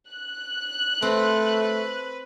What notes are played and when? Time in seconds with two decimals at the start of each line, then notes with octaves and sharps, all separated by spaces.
0.13 F#6
1.02 A3 C4 B4